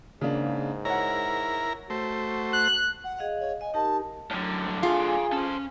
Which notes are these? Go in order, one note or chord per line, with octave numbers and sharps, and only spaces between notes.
G#2 C#3 A#3 D4
E4 A#4 C#5 F#5 A#5
A3 F#4 C5
F#6
F#5
G#4 D#5 F5
C#5
D#5 G#5
D#4 G4 A#4 A5
A2 D3 F#3 C#4
G2 F#3
F4 G#4 F5 G#5
C#4 A4 C5